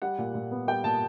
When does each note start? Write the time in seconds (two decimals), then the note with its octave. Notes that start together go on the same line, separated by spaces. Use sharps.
0.02 G3 F#5
0.18 A#2
0.35 A#2
0.51 B3
0.68 G3 G5
0.84 A#2 A5